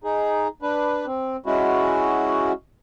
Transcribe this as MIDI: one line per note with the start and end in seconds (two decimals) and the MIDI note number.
0.04 0.48 63
0.04 0.48 68
0.62 1.06 62
0.62 1.06 71
1.06 1.37 60
1.46 2.52 56
1.46 2.52 61
1.46 2.52 64
1.46 2.52 66